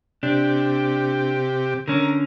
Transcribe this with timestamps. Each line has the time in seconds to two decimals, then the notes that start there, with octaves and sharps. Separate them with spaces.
0.23 C3 D4 G4
1.88 D3 C#4 A#4